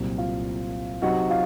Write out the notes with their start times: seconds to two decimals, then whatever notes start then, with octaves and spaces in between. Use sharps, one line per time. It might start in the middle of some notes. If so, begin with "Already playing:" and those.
Already playing: C2 A#2 F#3 C4
0.18 F4 F5
1.02 C3 F#3 C4 D#4 F#4 F#5
1.30 F4 F5